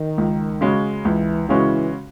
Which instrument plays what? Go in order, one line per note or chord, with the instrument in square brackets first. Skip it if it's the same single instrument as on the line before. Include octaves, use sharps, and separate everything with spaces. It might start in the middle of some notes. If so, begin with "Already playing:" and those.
Already playing: [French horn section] D#3
[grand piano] C#2
C#3 G#3 C#4 F#4
[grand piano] C#2 [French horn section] E3
[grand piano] C#3 G#3 C#4 F#4 [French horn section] E3